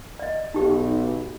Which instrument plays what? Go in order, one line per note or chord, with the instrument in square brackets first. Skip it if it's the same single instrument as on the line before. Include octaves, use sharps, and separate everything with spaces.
[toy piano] D5 D#5
[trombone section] B1 [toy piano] D#4 G4